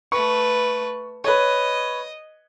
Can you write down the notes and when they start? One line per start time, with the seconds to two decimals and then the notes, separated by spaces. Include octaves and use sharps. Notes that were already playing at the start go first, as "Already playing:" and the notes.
0.12 A3 B4 C#6
1.24 B4 C#5 D#5